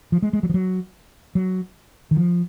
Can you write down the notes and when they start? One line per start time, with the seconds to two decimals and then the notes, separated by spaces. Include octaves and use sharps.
0.12 F3
0.22 G#3
0.33 G#3
0.43 F#3
0.49 F3
0.54 F#3
1.35 F#3
2.11 D#3
2.17 F3